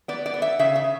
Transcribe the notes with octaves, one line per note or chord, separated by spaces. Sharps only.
B3 D5
D5
B3
E5
C#3 E5
E5
C#3